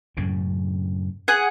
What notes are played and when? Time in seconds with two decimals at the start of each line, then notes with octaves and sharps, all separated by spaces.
0.17 F#2 A2 C#3
1.28 G#4 F#5